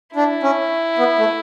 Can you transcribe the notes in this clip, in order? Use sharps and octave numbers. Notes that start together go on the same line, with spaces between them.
D4 E4
C#4
B3
A3